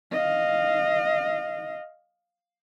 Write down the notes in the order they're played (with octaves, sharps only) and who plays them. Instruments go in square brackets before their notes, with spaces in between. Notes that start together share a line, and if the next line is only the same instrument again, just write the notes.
[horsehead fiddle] D#5 F5